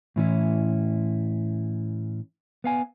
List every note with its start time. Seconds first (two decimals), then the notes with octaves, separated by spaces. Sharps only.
0.16 A2 E3 C#4 E4
2.64 B3 F5 G#5